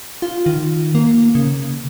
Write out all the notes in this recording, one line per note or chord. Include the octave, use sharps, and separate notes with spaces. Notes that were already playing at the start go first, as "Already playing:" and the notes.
F4
D#3
A#3
C#3